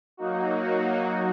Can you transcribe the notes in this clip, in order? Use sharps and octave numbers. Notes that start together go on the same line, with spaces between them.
F#3 A#3 D#4 F#4